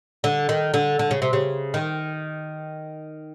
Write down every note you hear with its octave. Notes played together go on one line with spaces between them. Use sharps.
D3
D#3
D3
D3
C#3
C3
C#3
D#3